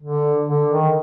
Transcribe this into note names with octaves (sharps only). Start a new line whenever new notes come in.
D3
D3
D#3